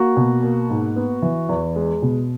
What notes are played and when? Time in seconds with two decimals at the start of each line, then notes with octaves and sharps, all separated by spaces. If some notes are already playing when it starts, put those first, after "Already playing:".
Already playing: A#3 F#4
0.17 B2
0.43 A#3
0.70 G#2
0.96 B3
1.22 E3
1.49 E2
1.76 G#3
2.02 B2